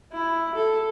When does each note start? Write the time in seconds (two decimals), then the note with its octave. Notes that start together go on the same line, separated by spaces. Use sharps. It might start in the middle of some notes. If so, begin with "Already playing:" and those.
0.12 E4
0.55 A4